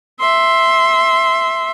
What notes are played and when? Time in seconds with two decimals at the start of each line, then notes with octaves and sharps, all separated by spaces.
0.20 E5 C6